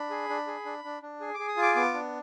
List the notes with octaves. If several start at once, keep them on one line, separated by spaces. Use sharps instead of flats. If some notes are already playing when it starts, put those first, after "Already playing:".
Already playing: D4 B5
G#4
D4
G#4
D4
D4
D4
G#4
D6
G#4
D#6
F4
D6
B3 D6
D4